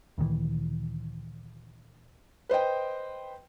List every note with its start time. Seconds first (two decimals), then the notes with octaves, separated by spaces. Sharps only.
0.18 D2 A#2 D#3 E3
2.49 B4 C5 D#5 G5